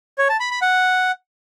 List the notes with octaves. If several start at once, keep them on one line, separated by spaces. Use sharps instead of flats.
C#5
A5
B5
B5
F#5